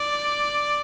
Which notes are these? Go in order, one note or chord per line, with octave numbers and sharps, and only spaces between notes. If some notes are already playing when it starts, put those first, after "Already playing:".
Already playing: D5